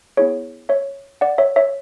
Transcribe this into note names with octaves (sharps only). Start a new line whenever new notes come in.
B3 E4 G#4 C#5
C#5 E5
D5 F#5
C#5 E5
C#5 E5